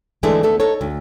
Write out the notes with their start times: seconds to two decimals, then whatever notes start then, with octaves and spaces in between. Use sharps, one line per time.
0.23 D3 E3 G#3 A3 D4 G#4
0.43 D2 A3 B3 A4
0.60 D#4 A4 C#5
0.81 D2